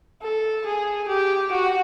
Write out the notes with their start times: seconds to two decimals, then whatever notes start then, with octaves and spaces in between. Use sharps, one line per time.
0.22 A4
0.66 G#4
1.08 G4
1.52 F#4